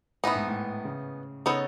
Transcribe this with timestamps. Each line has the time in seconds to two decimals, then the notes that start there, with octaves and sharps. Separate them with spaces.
0.24 A2 E3 B3 D#4
0.35 G#2
0.48 A2
0.85 C#3
1.46 C#3 B3 D#4 A4 C#5